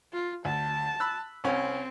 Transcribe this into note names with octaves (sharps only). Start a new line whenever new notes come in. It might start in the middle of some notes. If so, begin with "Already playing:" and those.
F4
D2 A5
B5 E6 F#6
C2 C4 C#4